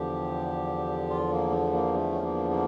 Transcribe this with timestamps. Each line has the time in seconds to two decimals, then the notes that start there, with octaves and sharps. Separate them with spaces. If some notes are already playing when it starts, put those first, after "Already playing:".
Already playing: E2 D3 F3 G4
1.09 F4
1.31 A#3
1.51 A3
1.73 A#3
1.94 A3
2.12 C#4
2.22 A#3
2.50 A#3